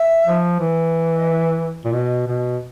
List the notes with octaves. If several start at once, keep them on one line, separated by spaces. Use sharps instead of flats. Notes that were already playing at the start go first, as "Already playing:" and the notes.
Already playing: E5
F3
E3
D#5
E5
A#2
B2 D#5
B2